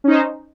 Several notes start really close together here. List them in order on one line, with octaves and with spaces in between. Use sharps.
C#4 D#4 C5